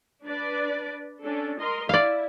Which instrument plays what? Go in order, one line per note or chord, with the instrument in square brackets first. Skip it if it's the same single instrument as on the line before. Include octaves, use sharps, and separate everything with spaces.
[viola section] D4 B4 D5
C#4 D4 A4
A#4 D#5 C6
[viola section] E4 [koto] D5 F5